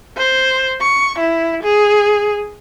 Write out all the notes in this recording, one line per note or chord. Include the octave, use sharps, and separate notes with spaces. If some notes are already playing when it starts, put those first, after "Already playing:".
C5
C#6
E4
G#4